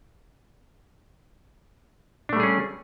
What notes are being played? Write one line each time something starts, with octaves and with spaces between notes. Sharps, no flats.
G3 A3 C#4 D4 G#4